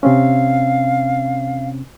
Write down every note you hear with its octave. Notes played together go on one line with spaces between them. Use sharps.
C3 C4 C#4 F5